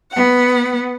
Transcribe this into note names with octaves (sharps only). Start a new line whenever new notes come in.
B3 F#5